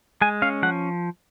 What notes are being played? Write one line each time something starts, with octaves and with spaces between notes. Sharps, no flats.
G#3 G#5
C#4 F5
F3 F#5